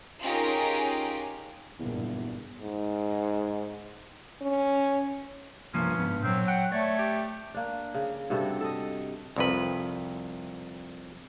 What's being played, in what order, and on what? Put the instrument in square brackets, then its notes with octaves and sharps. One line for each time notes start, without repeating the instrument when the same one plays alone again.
[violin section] C#4 D#4 F4 G4 G#4 A#4
[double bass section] F#1 G2 A#2 [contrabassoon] E2
[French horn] G#2
C#4
[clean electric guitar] C2 F3 A#3 [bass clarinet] G2 [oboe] C#4
[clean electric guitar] G#2 B3
[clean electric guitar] A#2 [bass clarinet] F#3 [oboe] C4
[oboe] F#5 [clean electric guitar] G5
[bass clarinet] A3 [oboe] C#5 [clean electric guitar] D5
[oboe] G4
[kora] A#3 D4
C#3
G2 C3 F#4 A4
A4 D#5
[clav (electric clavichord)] C2 F2 B4